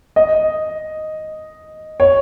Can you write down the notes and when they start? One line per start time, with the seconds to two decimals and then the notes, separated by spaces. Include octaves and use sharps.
0.16 D#5
2.00 C#5